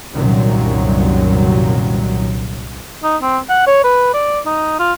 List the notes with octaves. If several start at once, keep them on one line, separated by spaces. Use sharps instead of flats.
C2 F#2 A#2 D#3 F#3
D#4
C4
F#5
C#5
B4
D5
D#4
F4